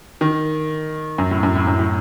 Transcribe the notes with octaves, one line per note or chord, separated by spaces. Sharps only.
D#3
F#2
A2
F#2
A2
F#2
A2